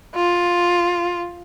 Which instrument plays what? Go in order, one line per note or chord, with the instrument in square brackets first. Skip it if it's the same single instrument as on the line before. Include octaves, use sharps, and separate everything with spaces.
[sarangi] F4